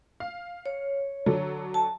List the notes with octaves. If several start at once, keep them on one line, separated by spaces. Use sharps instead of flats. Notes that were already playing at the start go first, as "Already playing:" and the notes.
F5
C#5
D3 F#3 A4
A5